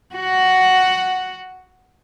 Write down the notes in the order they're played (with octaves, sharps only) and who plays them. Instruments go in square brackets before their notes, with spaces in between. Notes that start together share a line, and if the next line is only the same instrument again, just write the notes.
[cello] F#4 F#5